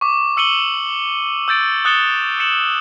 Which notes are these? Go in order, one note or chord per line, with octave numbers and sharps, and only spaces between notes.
C#6 D6
E6 C#7 D#7 F#7 G7
E6 G6 A6 D7
D#6 F#6 A6 C#7 E7 G7
C#7 E7 F#7